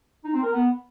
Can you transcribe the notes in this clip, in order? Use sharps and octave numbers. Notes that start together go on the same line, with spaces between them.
D#4
C4
A#4
B3